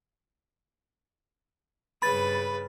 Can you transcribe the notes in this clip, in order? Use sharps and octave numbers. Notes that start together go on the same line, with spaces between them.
G2 C#3 B4 B5 A6